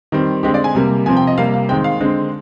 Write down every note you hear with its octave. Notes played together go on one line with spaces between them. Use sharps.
D#3 G3 C4
D3 G#3 C4 G4
D5
G#5
C3 G3 A#3
C3 F3 C4 G#5
G5
D#5
C3 G3 A#3 F5
F5
D#3 G#3 C4 G5
F5
D3 G#3 C4